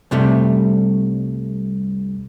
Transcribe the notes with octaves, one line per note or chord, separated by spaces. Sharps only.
C2 C3 G3 A3